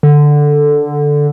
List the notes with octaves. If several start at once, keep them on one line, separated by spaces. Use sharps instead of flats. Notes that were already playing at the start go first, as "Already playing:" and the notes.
D3